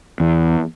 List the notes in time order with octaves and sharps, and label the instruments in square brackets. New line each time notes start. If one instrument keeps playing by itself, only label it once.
[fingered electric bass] E2